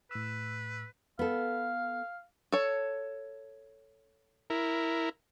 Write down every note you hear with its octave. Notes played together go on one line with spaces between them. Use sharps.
A2 B4 E6
B3 A4 F5
A4 C#5
E4 A#4